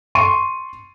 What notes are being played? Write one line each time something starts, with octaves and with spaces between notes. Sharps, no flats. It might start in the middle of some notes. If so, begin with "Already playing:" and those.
C6 C#6 D#7